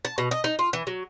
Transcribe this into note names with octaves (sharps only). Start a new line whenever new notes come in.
A5
B2
D#5
D#4
F4
E3
F#3